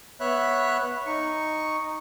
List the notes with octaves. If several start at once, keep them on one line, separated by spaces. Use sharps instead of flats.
B3 C#5 E5 B5 F#6
D#4 C#6